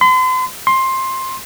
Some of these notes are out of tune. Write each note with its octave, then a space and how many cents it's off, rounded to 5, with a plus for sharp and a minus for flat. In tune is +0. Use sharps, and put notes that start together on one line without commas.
C6 -40
C6 +15